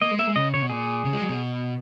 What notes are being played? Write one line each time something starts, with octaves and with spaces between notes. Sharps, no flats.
A#3 D#5
G#3
A#3 E5
G#3
C#3 D#5
C#3 C#5
B2
A#2 G#4
C#3
G#3
F#3
B2